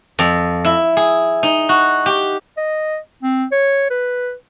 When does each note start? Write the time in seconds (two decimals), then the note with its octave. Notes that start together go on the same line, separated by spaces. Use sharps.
0.19 F2
0.65 E4
0.97 G#4
1.43 D#4
1.69 F#4
2.06 G4
2.57 D#5
3.23 C4
3.52 C#5
3.90 B4